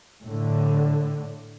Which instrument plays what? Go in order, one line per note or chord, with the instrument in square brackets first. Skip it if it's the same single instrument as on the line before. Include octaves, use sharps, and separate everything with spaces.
[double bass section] A2 D3